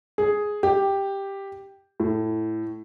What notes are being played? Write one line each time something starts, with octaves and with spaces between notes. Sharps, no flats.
G#4
G4
A2